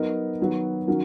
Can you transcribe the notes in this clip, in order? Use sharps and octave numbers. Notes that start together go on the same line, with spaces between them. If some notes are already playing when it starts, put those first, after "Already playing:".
Already playing: F#3 B3 D#4 A#4 D#5
D#3 F#3 B3
D#3 F#3 C#4 F#4 A#4